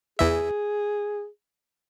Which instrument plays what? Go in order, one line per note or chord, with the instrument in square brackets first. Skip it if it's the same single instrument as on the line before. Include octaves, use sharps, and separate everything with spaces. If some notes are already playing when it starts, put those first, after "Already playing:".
[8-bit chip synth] E2 E3 E5 [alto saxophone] G#4